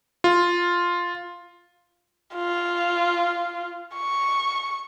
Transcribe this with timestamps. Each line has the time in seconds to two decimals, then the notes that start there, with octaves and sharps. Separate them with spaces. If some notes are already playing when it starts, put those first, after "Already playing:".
0.24 F4
2.35 F4
3.95 C#6